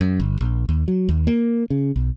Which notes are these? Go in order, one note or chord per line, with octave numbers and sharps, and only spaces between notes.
F#2
G1
A#1
D#2
F#3
D#2
A#3
C#3
B1